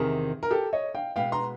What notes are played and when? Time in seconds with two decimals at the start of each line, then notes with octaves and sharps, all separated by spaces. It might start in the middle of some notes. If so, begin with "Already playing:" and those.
Already playing: E2 C3 D#3 G#4 A#4
0.43 A#4
0.51 G4 A4
0.73 C#5 D#5
0.95 F5 G5
1.16 B2 G#3 B3 F5 G5
1.32 A#5 C6